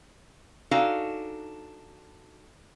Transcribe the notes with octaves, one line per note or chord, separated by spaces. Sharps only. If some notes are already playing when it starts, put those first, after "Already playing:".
D4 D#4 F#4 A4 F5 G#5